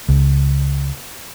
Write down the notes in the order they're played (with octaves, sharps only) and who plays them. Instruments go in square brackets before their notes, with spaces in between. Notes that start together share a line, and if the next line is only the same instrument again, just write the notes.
[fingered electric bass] C#2